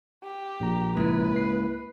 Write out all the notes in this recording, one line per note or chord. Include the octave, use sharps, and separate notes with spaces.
G4
A#1 A#2 A#5
C#2 G#2 A#3 E4 B4 F#6
C7